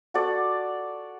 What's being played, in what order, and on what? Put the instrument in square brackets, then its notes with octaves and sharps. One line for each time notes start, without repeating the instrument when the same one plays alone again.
[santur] F#4 A4 D5